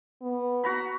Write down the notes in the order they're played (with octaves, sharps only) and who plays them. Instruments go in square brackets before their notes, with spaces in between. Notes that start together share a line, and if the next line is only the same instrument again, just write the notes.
[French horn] B3
[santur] F#4 A#5 B5